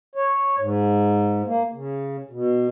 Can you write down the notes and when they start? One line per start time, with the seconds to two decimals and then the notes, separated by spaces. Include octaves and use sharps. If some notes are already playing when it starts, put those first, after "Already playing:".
0.16 C#5
0.60 G#2
1.47 A#3
1.73 C#3
2.31 B2